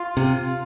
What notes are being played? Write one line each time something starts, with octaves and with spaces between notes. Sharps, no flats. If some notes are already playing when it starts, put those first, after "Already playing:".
Already playing: F4
C3